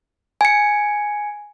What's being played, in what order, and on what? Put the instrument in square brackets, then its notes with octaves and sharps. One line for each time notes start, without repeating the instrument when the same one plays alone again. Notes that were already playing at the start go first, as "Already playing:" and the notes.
[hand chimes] G#5 C#7